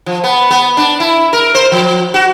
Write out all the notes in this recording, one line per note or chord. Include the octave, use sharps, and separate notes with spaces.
F3
B3
B3
D4
E4
A#4
C5
F3
F#4